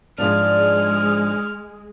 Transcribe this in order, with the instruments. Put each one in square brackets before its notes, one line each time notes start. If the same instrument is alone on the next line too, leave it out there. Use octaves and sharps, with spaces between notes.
[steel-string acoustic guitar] G#2 F3 D4 [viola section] G#3 [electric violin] F6